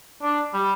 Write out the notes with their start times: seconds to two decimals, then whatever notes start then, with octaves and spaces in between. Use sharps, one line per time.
0.22 D4
0.54 G3